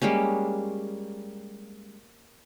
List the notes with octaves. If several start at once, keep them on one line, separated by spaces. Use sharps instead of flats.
G3 G#3 A#3 C#4